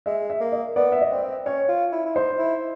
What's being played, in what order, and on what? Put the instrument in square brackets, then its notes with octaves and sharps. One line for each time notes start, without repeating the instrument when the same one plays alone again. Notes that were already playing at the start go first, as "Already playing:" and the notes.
[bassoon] G#3 [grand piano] E5
[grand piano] E5
[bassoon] A#3
[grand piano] D#5
[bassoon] B3 [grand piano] D5
[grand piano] E5
D#5
[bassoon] C4 [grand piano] D5
[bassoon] C#4 [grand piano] C#5
[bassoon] F4
E4
E4
[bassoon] D#4 [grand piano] C5
[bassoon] E4